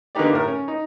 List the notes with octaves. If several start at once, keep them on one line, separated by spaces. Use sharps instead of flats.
D3 A#3 B3 D#4 G4 D5
A2 A#4
C#4
D#4